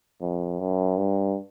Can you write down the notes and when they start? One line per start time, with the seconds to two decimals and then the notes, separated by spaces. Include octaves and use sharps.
0.21 F2
0.59 F#2
0.97 G2